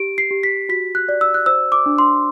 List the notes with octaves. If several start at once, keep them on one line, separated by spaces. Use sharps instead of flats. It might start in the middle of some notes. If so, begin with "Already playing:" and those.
Already playing: G4 D7
C7
G4
B6
F#4 B6
F#6
D5
E6
F#6
C5 E6
D6
D4
C6